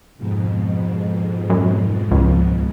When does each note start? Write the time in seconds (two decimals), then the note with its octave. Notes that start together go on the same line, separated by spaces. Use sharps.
0.18 F2 G#2 B2
1.50 F#2
2.11 C#2